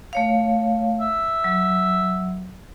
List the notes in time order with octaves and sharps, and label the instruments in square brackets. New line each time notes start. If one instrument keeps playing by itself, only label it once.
[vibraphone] A3 C#5 F5
[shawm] E5
[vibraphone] F#3